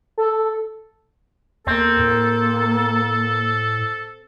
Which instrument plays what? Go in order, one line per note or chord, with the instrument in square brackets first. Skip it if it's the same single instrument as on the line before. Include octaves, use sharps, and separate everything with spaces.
[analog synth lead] A4
[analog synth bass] E2 [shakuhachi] A#3 [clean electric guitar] C4 [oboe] A4
[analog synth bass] A2